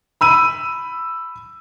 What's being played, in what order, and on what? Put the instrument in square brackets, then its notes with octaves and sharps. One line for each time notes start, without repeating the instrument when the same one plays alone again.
[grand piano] B5 E6 D#7